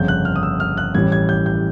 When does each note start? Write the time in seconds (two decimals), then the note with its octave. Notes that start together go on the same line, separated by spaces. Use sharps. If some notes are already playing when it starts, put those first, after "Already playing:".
Already playing: G1 F2 C#3 G6
0.08 F#6
0.25 F6
0.36 D#6
0.43 E6
0.60 F6
0.77 F#6
0.95 A1 A2 E3 G3 G#6
1.12 G#6
1.29 G6
1.46 G6